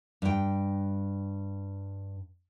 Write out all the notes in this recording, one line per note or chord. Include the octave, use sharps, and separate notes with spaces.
G2 G5